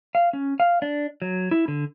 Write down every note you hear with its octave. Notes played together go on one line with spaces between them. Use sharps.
F5
C#4
F5
D4
F#3
E4
D3